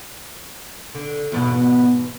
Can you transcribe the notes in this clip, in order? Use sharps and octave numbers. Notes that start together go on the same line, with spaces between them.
D3
E2 G#2 B2